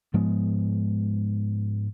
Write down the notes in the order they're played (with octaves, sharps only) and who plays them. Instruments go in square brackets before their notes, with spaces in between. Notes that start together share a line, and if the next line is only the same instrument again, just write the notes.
[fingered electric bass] G#2 F3 G#3 B3